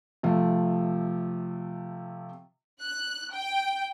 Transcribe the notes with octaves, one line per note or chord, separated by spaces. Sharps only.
C3 F3 A3
F#6
G5